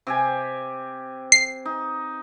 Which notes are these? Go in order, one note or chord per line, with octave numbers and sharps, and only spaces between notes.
C3 G4 G#5
C7
D#4